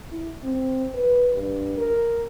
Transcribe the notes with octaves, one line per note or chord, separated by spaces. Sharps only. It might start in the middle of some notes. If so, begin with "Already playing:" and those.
E4
C4
B4
G2
A#4